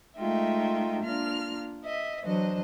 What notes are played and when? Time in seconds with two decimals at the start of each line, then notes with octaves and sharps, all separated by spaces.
0.18 G#3 A3 D#4 F4 E5 G5
1.03 A#3 D4 F4 F6
1.84 D#5 E5
2.23 E3 F#3 D4 C5 D#5